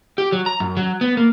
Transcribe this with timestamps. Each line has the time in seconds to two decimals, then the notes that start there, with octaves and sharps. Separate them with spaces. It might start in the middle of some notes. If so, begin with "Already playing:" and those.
0.18 G4
0.32 F#3
0.46 A#5
0.60 F#2
0.77 F#3
1.01 B3
1.17 A#3